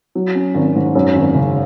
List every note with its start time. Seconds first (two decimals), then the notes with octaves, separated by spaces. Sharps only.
0.15 F#3
0.35 C#4
0.55 G#1
0.75 G#2
0.95 F#2
1.15 G#1
1.34 C#3